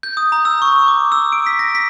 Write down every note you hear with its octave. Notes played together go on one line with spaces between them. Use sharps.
G6
D#6
A#5
E6
C#6
D6
E6
D7
B6
A#6
B6